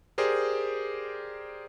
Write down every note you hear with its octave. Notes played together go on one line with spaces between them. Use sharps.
G4 G#4 A#4 C5 D5